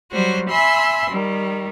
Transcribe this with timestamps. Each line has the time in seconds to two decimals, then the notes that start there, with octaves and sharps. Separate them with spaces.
0.11 F#3 G3 F#4 C5 C#5
0.49 E5 G#5 B5 C6 E6
1.11 D#3 G3